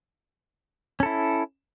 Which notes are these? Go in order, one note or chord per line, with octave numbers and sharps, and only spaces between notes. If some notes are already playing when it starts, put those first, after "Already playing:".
C#4 E4 A4